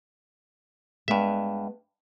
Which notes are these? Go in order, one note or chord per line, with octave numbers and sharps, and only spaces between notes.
G2 G#3 B3 E5